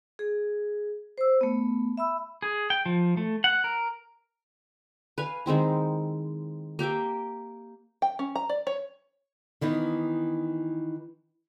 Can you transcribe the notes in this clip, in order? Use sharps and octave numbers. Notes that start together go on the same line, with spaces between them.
G#4
C5 E6
A3 B3
E5 B5 E6
G#4
G5
F3
A3
F#5
A#4
B4 F5 G#5
D#3 G#3 C4 E4
A#3 G4 E5 G5
G5
C#4
A#5
D5
C#5
D#3 E3 B3 D#4